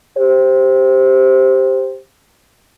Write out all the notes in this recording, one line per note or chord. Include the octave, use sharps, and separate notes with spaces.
G4 C5